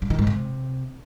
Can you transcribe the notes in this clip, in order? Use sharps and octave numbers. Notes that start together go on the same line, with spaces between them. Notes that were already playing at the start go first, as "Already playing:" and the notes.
G2
D#3
G#2
C3